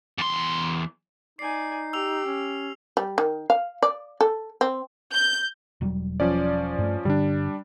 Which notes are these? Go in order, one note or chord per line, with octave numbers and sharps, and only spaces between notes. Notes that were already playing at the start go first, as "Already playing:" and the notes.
E2 C6
D#4 D5 G#5 C7
G4 E6 F7
C#4
G3
D#3
F5
D5
A4
C4
G6
E1 F#3 G3
F3 C#4 D5
G2 A3
G2 D3 G3 D4